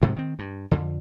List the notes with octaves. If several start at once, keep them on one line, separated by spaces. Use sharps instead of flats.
D2 G#2 C3 G#3
D#3 C4
G2
F2 D3